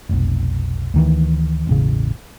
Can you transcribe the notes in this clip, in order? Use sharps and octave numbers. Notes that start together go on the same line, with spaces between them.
F1 B1
D2 D#3 E3
E1 A1 C#3